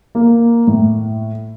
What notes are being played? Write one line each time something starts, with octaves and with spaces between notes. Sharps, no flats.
A#3
A2